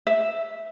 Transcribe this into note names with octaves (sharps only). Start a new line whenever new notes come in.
E5